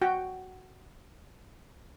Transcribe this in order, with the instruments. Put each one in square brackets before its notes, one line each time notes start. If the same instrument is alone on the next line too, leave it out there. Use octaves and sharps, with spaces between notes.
[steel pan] F#4 G5